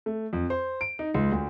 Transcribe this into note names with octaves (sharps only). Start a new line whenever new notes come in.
A3
F2
C5
D7
D#4
C#2
D2